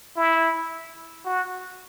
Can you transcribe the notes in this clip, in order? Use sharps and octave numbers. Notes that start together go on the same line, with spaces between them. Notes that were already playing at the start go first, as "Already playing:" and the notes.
E4
F#4